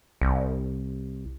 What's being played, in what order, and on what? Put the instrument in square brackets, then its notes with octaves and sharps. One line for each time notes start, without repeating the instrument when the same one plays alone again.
[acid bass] C2